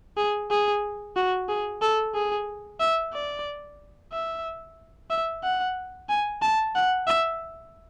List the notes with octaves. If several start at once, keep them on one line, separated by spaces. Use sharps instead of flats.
G#4
G#4
F#4
G#4
A4
G#4
E5
D5
E5
E5
F#5
G#5
A5
F#5
E5